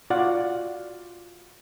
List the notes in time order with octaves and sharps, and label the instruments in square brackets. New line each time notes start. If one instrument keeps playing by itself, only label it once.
[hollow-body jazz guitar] F4 F#4 D5 F5 F#5